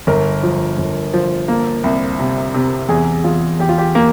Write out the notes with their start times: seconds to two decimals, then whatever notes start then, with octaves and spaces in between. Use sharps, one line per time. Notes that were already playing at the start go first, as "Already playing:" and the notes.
0.07 G1 A#4
0.43 F3
0.78 G1
1.14 F3
1.48 A#3
1.84 C2
2.19 C3
2.54 C3
2.89 E2 G#4
3.24 E2 F4
3.59 E2 G4
3.69 F4
3.78 G4
3.95 A#3